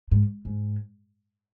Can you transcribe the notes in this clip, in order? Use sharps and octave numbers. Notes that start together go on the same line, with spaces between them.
G#2
G#2